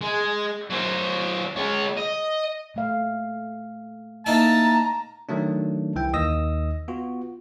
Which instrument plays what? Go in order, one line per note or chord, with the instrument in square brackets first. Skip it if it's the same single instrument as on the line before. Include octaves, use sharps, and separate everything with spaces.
[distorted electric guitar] G#3
F#3 C5
G#3 C#5
D#5
[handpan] A#2 A3 F5
[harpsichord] A#3 D#4 E4 [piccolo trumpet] A5 [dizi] A#5
[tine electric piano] D#3 F#3 A3 D4
C2 E3 G5
D#2 D#3 D#5 D#6 E6 A#6
B3 F4 F#4